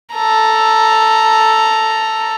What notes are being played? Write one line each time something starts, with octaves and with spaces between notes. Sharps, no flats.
A4 A#5